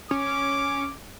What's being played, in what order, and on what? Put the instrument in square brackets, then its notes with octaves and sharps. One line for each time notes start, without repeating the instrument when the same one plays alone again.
[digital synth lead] C#4 [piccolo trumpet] D6